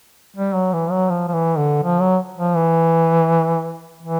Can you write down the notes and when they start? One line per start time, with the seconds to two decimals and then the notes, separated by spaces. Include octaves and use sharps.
0.37 G3
0.55 F#3
0.73 E3
0.91 F#3
1.10 F3
1.28 F3
1.33 E3
1.58 D3
1.83 F3
2.01 F#3
2.38 F3
2.56 E3
4.03 E3